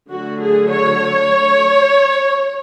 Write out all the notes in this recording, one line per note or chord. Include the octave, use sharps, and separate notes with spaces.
D3 F#3 A3 F#4
G#4
C#5